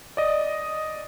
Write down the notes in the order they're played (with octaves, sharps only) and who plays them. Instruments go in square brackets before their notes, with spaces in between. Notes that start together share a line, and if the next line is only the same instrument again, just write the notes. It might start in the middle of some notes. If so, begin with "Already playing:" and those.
[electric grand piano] D5 D#5